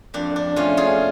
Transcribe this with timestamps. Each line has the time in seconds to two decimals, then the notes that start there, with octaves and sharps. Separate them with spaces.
0.14 F2 D4
0.36 D4
0.56 A3 C#4 F4
0.77 F4 G#4